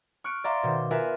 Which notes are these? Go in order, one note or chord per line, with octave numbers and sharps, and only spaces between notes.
C#6 F6 F#6 C#7 D7
D5 E5 F5 A#5 C6
B2 D#3 C5
F4 A#4 B4 E5 G#5